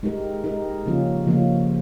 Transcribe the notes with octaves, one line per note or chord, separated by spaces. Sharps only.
G#3 D#4 G4 A#4
G#3 D#4 G4 A#4
C#3 F3 A#3 C#4 F4
C#3 F3 A#3 C#4 F4